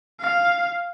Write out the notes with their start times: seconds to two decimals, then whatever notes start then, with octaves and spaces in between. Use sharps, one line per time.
0.21 F5